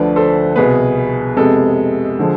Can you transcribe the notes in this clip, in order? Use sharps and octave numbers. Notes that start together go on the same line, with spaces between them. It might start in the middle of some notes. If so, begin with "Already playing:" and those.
Already playing: D2 D3 F3 B4 D5
A4 C5
C2 B2 B3 G#4 B4
F2 C3 G#3 B3 A4
D3 F3 G#3